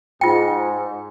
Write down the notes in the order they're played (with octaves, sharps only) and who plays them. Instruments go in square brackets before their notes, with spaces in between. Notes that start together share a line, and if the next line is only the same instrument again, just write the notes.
[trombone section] G#2 [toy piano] F4 G5